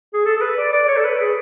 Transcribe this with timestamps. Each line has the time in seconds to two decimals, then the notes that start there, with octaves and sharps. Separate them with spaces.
0.13 G#4
0.25 A4
0.37 A4
0.41 B4
0.57 D5
0.72 D5
0.88 C#5
0.97 A4
1.05 B4
1.20 G#4